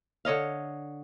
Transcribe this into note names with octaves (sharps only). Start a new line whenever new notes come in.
D3 C#5 D#5 F5